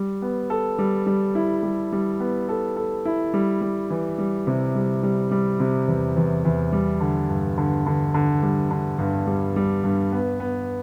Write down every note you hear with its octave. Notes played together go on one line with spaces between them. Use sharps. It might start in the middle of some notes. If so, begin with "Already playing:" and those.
Already playing: G3
B3
A4
G3
G3
E4
G3
G3
B3
A4
A4
E4
G3
G3
E3
G3
C3
G3
G3
G3
C3
E2
E2
E2
G3
D3
G2
D3
D3
D3
G3
D3
G2
G3
G3
G2
B3
B3